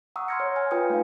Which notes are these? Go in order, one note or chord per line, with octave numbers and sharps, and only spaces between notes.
F#5 A#5 C#6 D#6 E6
C6 D#6 F6 G#6 A#6 C#7
C#5
G#5 F6
F4 B4 G5 G#5 D#6 C#7
A3 D#4 F5